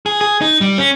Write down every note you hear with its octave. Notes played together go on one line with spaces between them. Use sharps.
G#4
G#4
D#4
G3
C#4